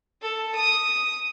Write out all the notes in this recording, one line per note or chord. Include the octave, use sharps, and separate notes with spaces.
A4
D#6